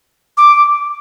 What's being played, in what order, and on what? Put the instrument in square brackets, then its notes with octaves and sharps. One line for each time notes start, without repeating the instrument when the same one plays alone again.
[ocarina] D6